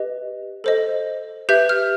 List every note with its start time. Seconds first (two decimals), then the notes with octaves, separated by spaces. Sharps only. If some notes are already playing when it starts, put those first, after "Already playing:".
Already playing: G4 B4 D#5
0.64 A4 C5 D#5
1.49 G4 B4 E5 G6
1.69 F6